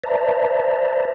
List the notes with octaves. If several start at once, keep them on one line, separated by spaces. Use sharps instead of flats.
B4 C5 D5 E5 A5 A#5